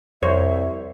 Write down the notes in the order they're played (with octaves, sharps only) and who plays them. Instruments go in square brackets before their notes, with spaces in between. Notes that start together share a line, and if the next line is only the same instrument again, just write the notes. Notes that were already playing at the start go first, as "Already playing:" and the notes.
[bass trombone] C2 [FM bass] F2 [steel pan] C5 C#5 [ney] E5